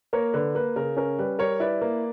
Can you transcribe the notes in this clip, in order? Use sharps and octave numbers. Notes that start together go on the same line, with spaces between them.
A#3 A#4 C#5
D3 B4
A#3 B4
C#3 A#4
C#4 A#4
G3 B4
G3 A#4 C#5
E4 B4 D5
A#3